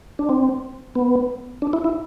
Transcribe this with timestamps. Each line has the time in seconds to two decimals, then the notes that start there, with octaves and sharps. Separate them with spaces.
0.19 D4
0.29 C4
0.95 B3
1.62 D4
1.73 E4
1.84 E4